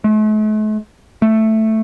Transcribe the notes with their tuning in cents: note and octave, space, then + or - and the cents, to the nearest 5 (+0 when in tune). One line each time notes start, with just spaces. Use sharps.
A3 -45
A3 +0